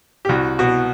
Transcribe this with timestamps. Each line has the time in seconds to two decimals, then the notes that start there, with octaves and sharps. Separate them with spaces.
0.25 G4
0.29 C2 F#4
0.59 B2 F#4